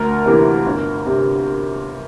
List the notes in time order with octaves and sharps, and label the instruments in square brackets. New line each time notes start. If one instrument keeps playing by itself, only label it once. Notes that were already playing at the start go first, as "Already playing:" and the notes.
Already playing: [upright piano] D2 A#4
C3 E3 A#3
G1
C3